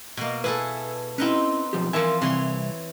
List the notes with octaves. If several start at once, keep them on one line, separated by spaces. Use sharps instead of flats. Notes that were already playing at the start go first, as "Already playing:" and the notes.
B2 A#3
E4 G#4 A4 B4
C4 C#4 D#4 E4 B4
B1 F3 G4
E3 F3 A#4 E5 G#5
C2 C3 E3 C#5 C6